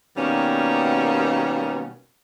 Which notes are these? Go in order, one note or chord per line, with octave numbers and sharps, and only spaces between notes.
B2 D#3 G3 A#3 B3 C#4